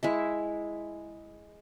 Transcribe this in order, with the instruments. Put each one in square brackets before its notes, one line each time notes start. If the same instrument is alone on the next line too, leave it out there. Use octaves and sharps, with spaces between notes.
[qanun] G#3 E4 E5